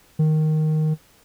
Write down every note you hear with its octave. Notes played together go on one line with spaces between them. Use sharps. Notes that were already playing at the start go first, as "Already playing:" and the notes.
D#3